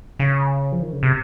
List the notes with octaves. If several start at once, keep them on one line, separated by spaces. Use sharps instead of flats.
C#3
F3
D#3
C#3
C3